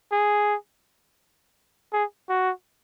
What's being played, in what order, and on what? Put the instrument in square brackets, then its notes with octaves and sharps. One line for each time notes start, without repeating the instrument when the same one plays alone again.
[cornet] G#4
G#4
F#4